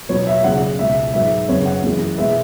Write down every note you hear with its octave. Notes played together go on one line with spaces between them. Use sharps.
E2 B2 F#3 B3 C#5
E5
E2 C#3 F#3 F#5
C#2 B2 G#3 E5
G#2 F#3 B3 E5
F#2 C#3 F#3 B3 C#5
F#5
F#2 E3 G#3 B3
B2 G#3 B3 E5